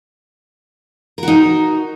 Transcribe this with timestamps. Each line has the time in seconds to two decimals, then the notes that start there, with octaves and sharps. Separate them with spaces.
1.18 A#4
1.23 F#4
1.28 D#4